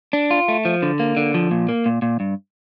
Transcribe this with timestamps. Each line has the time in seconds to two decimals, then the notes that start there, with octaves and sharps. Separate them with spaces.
0.13 D4
0.31 F4
0.48 A3
0.65 F3
0.82 D3
1.00 A#3
1.17 D3
1.34 F3
1.51 A#2
1.69 A#3
1.86 A#2
2.02 A#2
2.20 G2